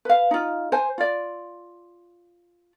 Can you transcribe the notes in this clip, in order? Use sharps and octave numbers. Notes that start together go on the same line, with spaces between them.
B4 F5
D#4 F4
C5 G#5
F4 D5